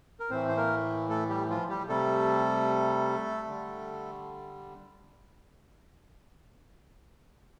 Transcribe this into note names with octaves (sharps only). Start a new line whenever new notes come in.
A#4
A2 E3 A3 C4 C5
C5
A#3 A#4
A3 A4
G3 G4
F3 F4
G3 G4
C3 G3 A3 A4
D3 G3